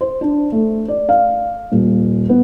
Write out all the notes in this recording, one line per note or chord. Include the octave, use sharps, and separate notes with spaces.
C5
D4
A3
D5
F5
D#1
B3